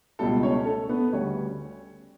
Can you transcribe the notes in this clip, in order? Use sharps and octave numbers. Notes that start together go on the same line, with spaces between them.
C#2 B2 G3 A3 A4
C#4 C#5
A3 A4
B3 B4
D2 C#3 G3 C#4 C#5